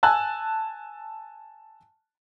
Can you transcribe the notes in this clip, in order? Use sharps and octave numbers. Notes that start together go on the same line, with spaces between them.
G#5 A5 E6 F#6